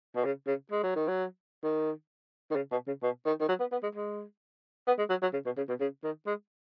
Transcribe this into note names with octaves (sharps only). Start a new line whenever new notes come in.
B2
C#3
C#3
G#3
F#3
D#3
F#3
D#3
D#3
C#3
B2
C#3
B2
D#3
D#3
F#3
B3
B3
G#3
G#3
B3
G#3
F#3
F#3
C#3
B2
C#3
B2
C#3
D#3
G#3